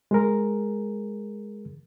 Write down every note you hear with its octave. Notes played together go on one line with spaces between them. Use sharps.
G#3 G#4 A#4